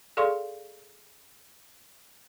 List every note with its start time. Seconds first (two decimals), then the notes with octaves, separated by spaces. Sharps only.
0.17 G#4 A4 D5 F5 C6 C#6